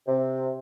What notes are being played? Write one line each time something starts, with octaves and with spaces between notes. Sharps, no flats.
C3